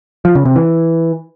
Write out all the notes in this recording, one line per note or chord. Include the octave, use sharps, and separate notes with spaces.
F3
C#3
C3
E3